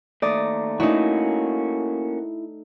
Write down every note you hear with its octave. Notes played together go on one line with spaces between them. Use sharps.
D#2 A3 D5 A#5 D#6
A3 A#3 C#4 D#4 E4 F#4